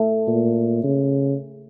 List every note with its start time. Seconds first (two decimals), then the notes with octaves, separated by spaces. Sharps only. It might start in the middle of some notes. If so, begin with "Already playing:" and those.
Already playing: A3
0.27 A#2
0.84 C#3